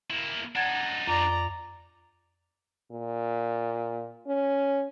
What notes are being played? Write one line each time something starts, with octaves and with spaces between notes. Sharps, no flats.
A#3 E4
D4 D#4 F#5 G#6 A6
F2 D5 A#5
A#2
C#4